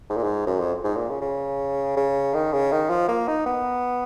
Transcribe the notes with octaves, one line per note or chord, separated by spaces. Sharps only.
G#2
A#2
G#2
F#2
F2
G#2
A#2
C#3
C#3
C#3
D#3
C#3
D#3
F3
A#3
D#4
B3